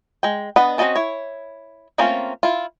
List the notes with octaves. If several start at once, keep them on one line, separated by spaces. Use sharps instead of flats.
G#3 G5
B3 D4 D#5 F#5 B5
C4 C#4 F#4 D#5 A5
E4 C#5
A3 A#3 C4 C#4 F4
E4 F4